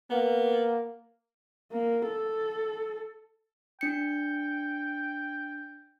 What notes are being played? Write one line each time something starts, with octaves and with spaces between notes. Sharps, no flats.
A#3 B3
A#3
A4
D4 G5 C#7